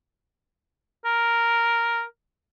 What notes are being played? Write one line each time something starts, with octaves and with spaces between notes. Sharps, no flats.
A#4